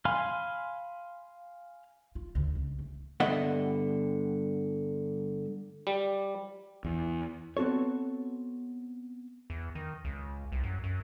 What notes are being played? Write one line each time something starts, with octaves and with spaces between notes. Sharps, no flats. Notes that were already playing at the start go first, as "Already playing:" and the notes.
F5 G#5 B5 C6 F6
F4
D2
C#2
A3
G2 D3 B3 D#5 E5 F#5
G3
E2
B3 C4 F#4 A4 C#5
E2
D#3
C#2
C2
F#2
F#2